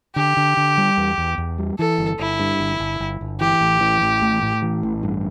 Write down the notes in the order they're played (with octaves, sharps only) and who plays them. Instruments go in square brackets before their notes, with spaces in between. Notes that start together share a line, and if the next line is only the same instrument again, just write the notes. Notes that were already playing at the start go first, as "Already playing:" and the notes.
[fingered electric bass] D3 [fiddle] G4
[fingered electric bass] D3
D3
G3
E2
E2
E2
G3
[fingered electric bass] E3 [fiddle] A4
[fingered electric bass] G1
[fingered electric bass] G1 [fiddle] E4
[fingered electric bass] G2
G1
G1
G1
G1
[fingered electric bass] E3 [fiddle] G4
[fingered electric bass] A1
E3
A1
A2
A2
E3
A1
G2